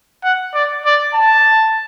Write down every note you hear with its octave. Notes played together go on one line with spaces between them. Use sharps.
F#5
D5
D5
A5